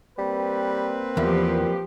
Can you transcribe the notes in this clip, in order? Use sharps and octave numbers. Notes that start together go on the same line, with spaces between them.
G3 A#3 C4 B4
E2 A#2 F3 G4